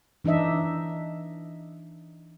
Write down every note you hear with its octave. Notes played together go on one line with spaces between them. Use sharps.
E3 D4 D#4 D#5 E5